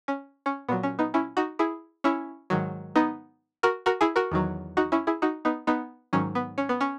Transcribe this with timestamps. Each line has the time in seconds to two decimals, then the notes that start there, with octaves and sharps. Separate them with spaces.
0.08 C#4
0.46 C#4
0.69 A#2 F#3 B3
0.83 C#4
0.99 B3 D#4
1.14 C#4 E4
1.37 D#4 F#4
1.59 E4 G#4
2.04 C#4 E4
2.50 G#2 D#3 F#3
2.95 B3 D#4
3.63 F#4 A#4
3.86 F#4 A#4
4.01 E4 G#4
4.16 F#4 A#4
4.32 E2 D#3 F#3
4.77 D#4 F#4
4.92 C#4 E4
5.07 E4 G#4
5.22 D#4 F#4
5.45 B3 D#4
5.67 B3 D#4
6.13 G#2 D#3 F#3 C#4
6.35 B3
6.58 C#4
6.69 B3
6.81 C#4